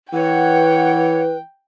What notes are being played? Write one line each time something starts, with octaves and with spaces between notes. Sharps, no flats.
E3 B4 C#5 F#5 G5